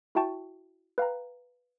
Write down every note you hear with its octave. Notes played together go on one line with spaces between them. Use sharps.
E4 F#4 E5 G5 A5 C#6
B4 F5 G5 A#5